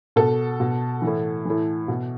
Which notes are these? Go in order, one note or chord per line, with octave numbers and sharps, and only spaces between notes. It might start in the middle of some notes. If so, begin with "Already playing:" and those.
B2 A4
B2
E3
A2
A2 E3
B2